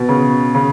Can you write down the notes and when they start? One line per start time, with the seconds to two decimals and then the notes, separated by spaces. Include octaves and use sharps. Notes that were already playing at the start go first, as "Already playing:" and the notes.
Already playing: B2
0.09 C#3
0.55 C#3